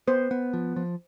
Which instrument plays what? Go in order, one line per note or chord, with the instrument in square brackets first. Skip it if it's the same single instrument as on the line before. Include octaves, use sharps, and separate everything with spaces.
[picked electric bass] B3 [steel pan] C5
[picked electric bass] B3
F3
F3